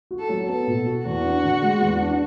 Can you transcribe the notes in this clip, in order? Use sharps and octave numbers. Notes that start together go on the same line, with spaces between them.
F#4
A4
F#3
B3 A4
B2
F#4
E2 F#4
D4
D3
G#3
E2
D4